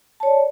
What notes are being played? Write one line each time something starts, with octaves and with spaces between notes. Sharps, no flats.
C#5 D5 A5